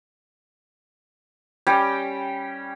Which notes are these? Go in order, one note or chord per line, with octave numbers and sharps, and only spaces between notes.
G3 C#4 G5